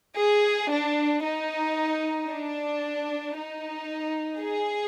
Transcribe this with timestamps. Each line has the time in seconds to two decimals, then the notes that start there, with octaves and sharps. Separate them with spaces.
0.17 G#4
0.71 D4
1.23 D#4
2.29 D4
3.36 D#4
4.41 G#4